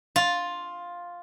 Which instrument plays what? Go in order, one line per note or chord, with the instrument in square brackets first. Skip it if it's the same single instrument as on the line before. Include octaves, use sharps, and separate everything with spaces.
[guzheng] F4